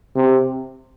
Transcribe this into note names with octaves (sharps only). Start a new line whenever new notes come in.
C3